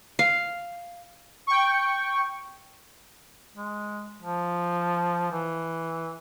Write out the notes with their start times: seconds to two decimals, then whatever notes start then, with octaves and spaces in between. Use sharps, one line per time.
0.19 F5
1.47 G5 C#6
3.56 G#3
4.22 F3
5.32 E3